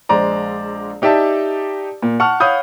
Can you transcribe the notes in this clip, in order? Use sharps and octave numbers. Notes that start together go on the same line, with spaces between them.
A#1 G#3 C5 D5 A#5
D#4 G4 D5 E5 A5
A#2
F#5 A5 C#6 F6
C#5 F5 F#5 B5 D#6 G6